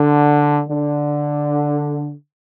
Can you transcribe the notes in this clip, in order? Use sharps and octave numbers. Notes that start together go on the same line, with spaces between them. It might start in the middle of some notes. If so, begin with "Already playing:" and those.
Already playing: D3
D3